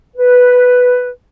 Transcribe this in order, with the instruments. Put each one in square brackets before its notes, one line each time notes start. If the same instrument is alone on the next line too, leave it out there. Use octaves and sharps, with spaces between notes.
[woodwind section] B4